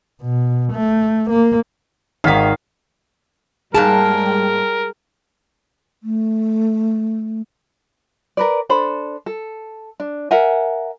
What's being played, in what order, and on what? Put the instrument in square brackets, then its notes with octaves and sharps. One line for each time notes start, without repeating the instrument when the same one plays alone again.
[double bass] B2
A3
A#3
[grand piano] G#1 B6 [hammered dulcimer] D#3 F5
[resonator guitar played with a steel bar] G#2 A#3 A5 [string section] G3 G#3 G5 [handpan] G#4 [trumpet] A#4
[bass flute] A3
[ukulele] A#4 B4 D5
D4 A4 C5 B5
A4
D4
A#4 E5 F#5 G#5